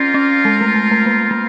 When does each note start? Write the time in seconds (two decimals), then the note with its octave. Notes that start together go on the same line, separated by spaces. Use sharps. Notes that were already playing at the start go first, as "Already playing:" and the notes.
Already playing: C4 C#4 F4 A#4
0.14 C#4
0.45 G#3
0.61 A3
0.75 G#3
0.91 A3
1.06 A#3
1.31 A#3